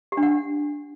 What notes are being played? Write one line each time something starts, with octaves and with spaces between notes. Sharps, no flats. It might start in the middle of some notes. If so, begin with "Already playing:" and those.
G4
D4
F#5